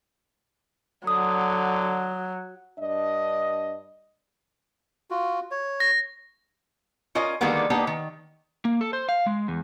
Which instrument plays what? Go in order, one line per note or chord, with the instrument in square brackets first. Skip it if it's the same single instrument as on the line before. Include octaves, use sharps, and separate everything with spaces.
[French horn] D3 [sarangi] F#3 [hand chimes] D#6
[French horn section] G2 D4 D#5
[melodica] F4 F#4
C#5
[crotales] A#6
[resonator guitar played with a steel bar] C#4 F4 A#4 D#5
D3 D#3 G3 G#3 A#3 B3
A#3 B3 D4 D#4 G4
D#3
[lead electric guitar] A#3
A4
C5
F5
G#3
E2